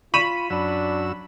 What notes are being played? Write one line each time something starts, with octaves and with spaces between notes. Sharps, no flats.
F4 B5 C#6 D#7 E7
F#2 F#3 D4 E6